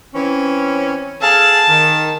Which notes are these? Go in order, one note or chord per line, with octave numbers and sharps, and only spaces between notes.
E3 C4 C#4
G#4 A4 F5 A5
D#3